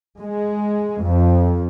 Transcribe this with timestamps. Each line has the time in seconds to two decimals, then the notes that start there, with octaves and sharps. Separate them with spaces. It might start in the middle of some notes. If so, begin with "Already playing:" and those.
0.22 G#3
1.04 F2